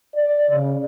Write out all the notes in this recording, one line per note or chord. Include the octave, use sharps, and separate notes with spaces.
D5
C#3